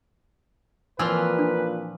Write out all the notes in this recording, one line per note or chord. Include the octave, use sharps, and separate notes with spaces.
A#2 E3 F3 C4 B4 G#5 E6
D4